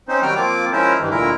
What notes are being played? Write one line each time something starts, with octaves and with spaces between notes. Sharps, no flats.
C4 C#4 D#4 C5
D#3 F#3 G3 F#4 G5 F6
F3 A#3 C4 F4 D6
F3 G#3 C#4 E4 A#4 C5
G2 D#3 E3
D2 A#2 G#3 E4 A#4